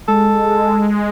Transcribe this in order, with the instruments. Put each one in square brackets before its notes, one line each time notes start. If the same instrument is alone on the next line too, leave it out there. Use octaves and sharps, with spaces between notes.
[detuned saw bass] G#3 [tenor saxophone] A4